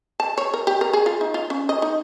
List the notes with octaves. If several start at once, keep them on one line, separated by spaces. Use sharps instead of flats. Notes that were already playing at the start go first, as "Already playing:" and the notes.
A5
C#5
A#4
G4
A#4
G#4
F4
D#4
F4
C#4
D#5
D#4